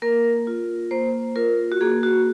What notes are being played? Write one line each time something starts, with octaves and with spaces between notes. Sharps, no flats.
A#3 A#4
F4
A#3 C5
F4 A#4
F#4
A#3 G#4
F#4